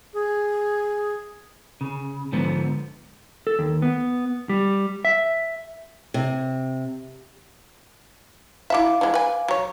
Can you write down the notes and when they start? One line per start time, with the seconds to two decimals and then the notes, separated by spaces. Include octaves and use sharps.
0.13 G#4
1.81 C#3
2.32 G#2 D3 F3 B3
3.47 A4
3.59 D#2
3.82 B3
4.49 G3
5.05 E5
6.14 C3
8.70 E4 F#4 E5 F5 D6
9.01 E3 F3 G#3
9.14 B4 G#5
9.48 F#3 C#5